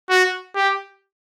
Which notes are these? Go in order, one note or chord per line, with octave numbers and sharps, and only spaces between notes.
F#4
G4